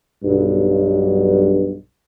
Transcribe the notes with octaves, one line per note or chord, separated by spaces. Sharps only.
B1 G2